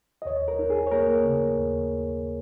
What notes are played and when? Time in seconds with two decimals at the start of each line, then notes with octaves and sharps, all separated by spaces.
0.22 D#5
0.25 D#2 C#5
0.48 A#4
0.59 D#4
0.70 G#4
0.87 C#5
0.91 A#3 A#4
1.24 C#3
1.58 D#2